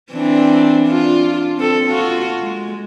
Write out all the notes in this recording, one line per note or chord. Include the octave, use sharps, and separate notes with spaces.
E3 C4 D4
D4 F4
C4 A4
F4 F#4
G#3